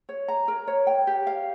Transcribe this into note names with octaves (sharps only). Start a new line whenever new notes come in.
C#5
A#5
A#4
C#5
G5
G4
F5